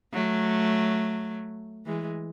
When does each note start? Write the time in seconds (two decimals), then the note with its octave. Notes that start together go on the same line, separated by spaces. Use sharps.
0.13 F#3 A3
1.86 E3 G#3